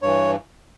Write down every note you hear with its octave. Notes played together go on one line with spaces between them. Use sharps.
G2 E3 C#5